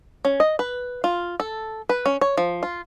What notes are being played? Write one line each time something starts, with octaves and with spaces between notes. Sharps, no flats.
C#4
D#5
B4
F4
A4
B4
C#4
C#5
F3
F4